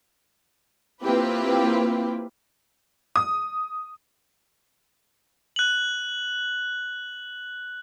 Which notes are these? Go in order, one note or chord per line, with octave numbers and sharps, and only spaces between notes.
A#3 C4 E4 F4 G4 B4
D#6
F#6 F#7